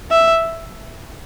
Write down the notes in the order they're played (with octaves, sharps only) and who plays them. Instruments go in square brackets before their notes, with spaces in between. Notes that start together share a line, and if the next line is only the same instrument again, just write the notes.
[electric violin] E5